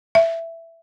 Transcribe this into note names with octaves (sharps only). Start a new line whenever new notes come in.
E5